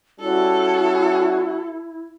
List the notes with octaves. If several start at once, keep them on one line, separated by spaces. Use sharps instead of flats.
G3 C#4 E4 F#4 A4